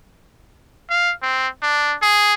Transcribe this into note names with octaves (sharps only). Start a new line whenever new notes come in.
F5
C4
D4
G#4